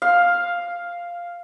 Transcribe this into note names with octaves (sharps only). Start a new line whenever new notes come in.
F5